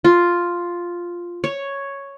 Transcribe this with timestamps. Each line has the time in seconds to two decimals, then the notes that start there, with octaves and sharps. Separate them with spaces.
0.04 F4
1.44 C#5